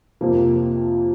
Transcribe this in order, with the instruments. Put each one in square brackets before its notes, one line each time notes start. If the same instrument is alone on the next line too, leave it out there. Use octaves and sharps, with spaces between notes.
[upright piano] F2 C3 F3 A#3